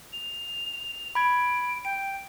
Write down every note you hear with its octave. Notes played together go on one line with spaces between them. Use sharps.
F7
B5 G#6 D7
G5 D7